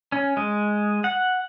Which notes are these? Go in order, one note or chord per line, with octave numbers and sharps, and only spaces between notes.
C#4
G#3
F#5